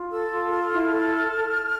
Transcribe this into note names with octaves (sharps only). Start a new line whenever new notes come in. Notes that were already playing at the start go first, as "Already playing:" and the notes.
Already playing: F4
A4 E6
F4
A4 F6
E4
A4